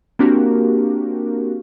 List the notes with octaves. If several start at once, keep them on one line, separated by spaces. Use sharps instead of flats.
A#3 C4 D4 F#4 G4 A#4